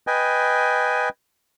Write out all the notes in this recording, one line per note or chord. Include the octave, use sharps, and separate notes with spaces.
B4 D#5 G5 G#5